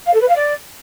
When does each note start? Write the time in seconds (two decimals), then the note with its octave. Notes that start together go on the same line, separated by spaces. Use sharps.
0.06 F5
0.14 A4
0.21 B4
0.28 F5
0.36 D5